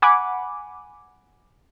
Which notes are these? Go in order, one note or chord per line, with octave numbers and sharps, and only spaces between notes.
F#5 G#5 B5 D6